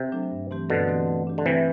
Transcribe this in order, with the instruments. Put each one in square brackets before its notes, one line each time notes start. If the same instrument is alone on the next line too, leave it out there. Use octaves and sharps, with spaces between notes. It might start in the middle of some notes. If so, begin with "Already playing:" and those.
Already playing: [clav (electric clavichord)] C3
[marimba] F#3 A3 D4 A4
G2
E3 A3 C4 G4
[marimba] G2 [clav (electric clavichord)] B2 D3
[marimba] E3 A3 C4 G4
A3
D4 G4
[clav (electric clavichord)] D3
[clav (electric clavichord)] C3 E3 [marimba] A3